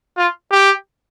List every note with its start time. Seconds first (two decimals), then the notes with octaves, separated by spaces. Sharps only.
0.17 F4
0.51 G4